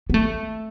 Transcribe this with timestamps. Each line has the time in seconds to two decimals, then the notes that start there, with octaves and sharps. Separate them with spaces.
0.10 B3
0.14 A3